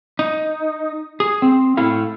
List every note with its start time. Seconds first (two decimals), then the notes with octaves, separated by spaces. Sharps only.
0.19 D#4
1.20 G#4
1.42 C4
1.77 A2 A3 E4 A4 F5